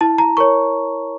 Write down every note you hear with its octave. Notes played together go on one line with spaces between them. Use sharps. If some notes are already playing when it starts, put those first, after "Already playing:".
E4 A5
A#5
A#4 C#5 C#6